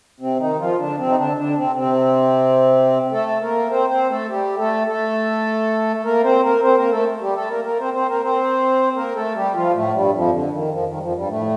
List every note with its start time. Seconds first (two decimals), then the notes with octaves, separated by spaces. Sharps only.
0.20 C3 C4
0.39 D#3 D#4
0.59 F3 F4
0.78 D3 D4
0.98 C3 C4
1.09 D#4
1.17 D3 D4
1.36 D3 D4
1.56 C3 C4
1.76 C3 C4
3.12 A3 A4
3.41 A#3 A#4
3.70 C4 C5
3.90 C4 C5
4.09 A3 A4
4.29 G3 G4
4.57 A3 A4
4.87 A3 A4
6.04 A#3 A#4
6.23 C4 C5
6.43 A#3 A#4
6.62 C4 C5
6.77 A#3 A#4
6.91 A3 A4
7.21 G3 G4
7.35 A3 A4
7.50 A#3 A#4
7.64 A#3 A#4
7.79 C4 C5
7.94 C4 C5
8.08 A#3 A#4
8.23 C4 C5
8.96 A#3 A#4
9.15 A3 A4
9.35 G3 G4
9.54 F3 F4
9.74 A2 A3
9.93 G2 G3
10.13 F2 F3
10.32 D3
10.52 D#3
10.71 F2 F3
10.86 D#3
10.96 G3
11.00 F2 F3
11.15 G2 G3
11.29 A2 A3